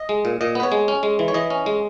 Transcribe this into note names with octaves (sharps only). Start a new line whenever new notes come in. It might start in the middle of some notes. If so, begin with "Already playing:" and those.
Already playing: D#5
G#3
A#2
A#2 D#5
B3 B4
C#5
G#3
C#4
G#3
E3
C#5
E3 D#5
C#4
G#3